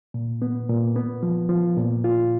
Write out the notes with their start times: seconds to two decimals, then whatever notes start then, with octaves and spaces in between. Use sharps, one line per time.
0.14 A#2
0.42 B3
0.69 A#2
0.96 B3
1.23 F3
1.49 F3
1.77 A#2
2.04 F4